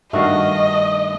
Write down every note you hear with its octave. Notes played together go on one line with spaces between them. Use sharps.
G2 D#3 A3 D4 F#4 D#5 F5